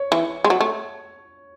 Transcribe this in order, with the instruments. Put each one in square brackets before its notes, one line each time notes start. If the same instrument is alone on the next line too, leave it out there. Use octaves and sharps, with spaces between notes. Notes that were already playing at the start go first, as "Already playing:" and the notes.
Already playing: [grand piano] C#5
[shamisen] E3
G#3
F#3
A3